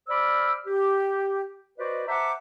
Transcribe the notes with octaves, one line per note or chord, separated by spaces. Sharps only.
C5 D5 B5 D6 E6 F6
G4
F#4 B4 C5 D5 D#5
C5 E5 F#5 A5 A#5 D6